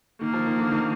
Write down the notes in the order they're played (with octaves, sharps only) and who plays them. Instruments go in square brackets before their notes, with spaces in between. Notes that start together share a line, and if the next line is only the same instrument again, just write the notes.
[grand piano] D#3 [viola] A#3
[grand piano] F3
D#3
D3
D#3